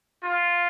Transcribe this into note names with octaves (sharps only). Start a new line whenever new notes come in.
F4